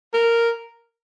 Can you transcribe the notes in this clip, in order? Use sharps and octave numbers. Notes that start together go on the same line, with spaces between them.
A#4